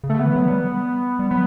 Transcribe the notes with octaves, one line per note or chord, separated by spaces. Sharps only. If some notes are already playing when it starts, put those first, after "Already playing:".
C#3
D3 A3
B3
E3
F#3
G3
G3
F#3 B3